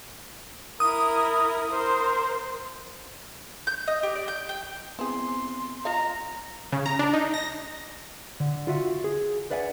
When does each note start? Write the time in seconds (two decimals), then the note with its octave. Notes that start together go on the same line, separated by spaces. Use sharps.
0.80 E4 A#4 D#6
1.72 A#4 C5
3.67 G6
3.88 D#5
4.03 G4
4.15 D5
4.28 G6
4.49 G5
4.99 B3 C4 E4 G#4 C6
5.85 F4 D#5 F5 A#5
6.72 C#3
6.86 A#5
6.99 D4
7.13 D#4
7.34 A#6
8.40 D3
8.67 F4 F#4 E5 F#5
9.04 G#4
9.51 B4 D5 E5 F#5 G#5